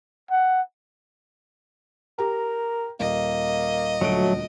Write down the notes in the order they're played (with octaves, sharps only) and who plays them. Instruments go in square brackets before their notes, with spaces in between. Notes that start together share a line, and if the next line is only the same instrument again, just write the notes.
[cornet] F#5
[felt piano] G4 A#5 [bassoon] A#4
[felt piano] D#1 [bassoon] A#3 [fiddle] D#5
[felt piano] D#1 D2 D7 [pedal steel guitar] F#3 A3